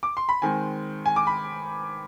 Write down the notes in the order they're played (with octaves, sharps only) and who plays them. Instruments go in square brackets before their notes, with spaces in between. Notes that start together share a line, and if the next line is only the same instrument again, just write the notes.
[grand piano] D6
C6
B5
D#3 G#3 C4 G#5
G#5
D6
B5